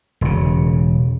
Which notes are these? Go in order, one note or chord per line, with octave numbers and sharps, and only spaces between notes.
E1 C#3